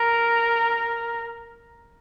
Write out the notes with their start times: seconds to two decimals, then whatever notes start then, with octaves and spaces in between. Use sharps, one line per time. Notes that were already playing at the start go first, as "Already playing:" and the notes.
Already playing: A#4